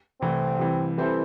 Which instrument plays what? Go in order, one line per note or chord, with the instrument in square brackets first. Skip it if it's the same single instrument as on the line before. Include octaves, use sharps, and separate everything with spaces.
[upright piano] C2 C3 E3 A3 E4 [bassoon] C4
[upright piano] C3 E3 G3
[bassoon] E3 [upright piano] G3 C4 E4 A4 C5